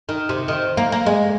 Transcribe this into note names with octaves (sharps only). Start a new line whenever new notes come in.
D#3
C3
D#3
A#3
A#3
G#3